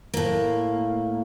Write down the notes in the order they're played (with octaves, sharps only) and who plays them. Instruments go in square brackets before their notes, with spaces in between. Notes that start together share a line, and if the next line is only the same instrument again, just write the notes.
[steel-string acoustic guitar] A2 A#3